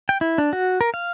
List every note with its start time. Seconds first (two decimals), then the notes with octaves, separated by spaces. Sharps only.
0.09 G5
0.21 E4
0.38 D4
0.53 F#4
0.81 A#4
0.94 F5